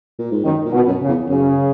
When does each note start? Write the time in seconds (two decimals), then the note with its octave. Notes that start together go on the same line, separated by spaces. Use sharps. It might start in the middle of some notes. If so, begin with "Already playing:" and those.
0.18 A#2
0.31 G#2
0.44 F#2 D#3
0.65 A#2
0.72 B2
0.87 F#2
1.01 C#3
1.08 E2
1.29 F#2 C#3